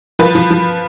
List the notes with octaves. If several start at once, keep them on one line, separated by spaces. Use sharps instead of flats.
F3 B4
F3
F3